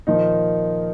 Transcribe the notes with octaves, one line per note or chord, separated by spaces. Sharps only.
A#2 D#3 F3 D#4